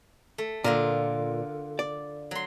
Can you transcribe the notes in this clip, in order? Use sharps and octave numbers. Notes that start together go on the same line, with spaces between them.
A3
A#2 D3 F4 A#4
D5
F#3 C6